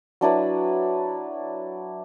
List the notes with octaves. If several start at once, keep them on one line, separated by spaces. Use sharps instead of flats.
F#3 D4 E4 B4